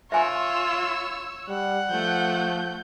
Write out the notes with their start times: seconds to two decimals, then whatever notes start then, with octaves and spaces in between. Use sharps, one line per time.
0.12 F4 C#5 E5 G#5 C6 E6
1.49 G3 F#5
1.90 F3 A3 G6